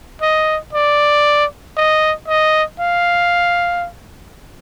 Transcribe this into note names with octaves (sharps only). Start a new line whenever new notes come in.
D#5
D5
D#5
D#5
F5